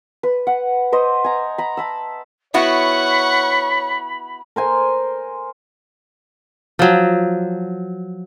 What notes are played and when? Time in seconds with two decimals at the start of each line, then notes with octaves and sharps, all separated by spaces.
0.23 B4
0.47 F#5
0.92 B4 C5 D#5
1.24 G#5 A#5
1.58 A#5 B5
1.77 A5 B5 E6
2.54 B3 E4 F#4 C#5 F#5 B5 C#6
4.56 A#4 C5 G#5
6.79 F3 F#3